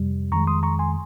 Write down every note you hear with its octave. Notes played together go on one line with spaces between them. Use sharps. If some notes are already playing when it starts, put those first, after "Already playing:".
Already playing: F2 C3 G3
F2 D#3 G#3 A#5 C#6
C6 D#6
A#5 C#6
G#5 C6